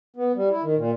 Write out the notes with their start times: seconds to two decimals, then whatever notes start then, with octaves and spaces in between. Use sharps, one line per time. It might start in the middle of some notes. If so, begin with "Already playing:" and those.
0.16 B3
0.35 G3
0.50 E4
0.63 D#3
0.77 A#2